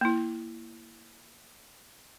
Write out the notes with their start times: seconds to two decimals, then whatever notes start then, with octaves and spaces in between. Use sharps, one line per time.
0.01 A#3 E4